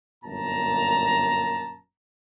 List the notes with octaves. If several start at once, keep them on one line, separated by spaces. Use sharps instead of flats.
G1 F#2 A#2 A#3 A5 A#5